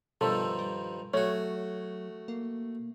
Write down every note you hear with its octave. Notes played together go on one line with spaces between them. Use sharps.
G2 B2 D#3 F3 A4
G3
F#3 A3 F#4 C#5
A#3